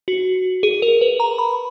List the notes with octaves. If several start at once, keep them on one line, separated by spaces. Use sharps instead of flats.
F#4
G#4
A#4
B4
A#5
B5